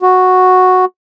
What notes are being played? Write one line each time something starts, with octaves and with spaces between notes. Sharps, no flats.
F#4